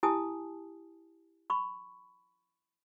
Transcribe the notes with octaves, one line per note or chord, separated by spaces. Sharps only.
E4 G4 G#5 A5 D#6
B5 C#6